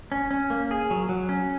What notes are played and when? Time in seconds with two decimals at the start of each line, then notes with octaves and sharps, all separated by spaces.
0.12 C#4
0.31 C#4
0.50 A#3
0.71 G#4
0.91 F#3
1.09 F#3
1.29 C#4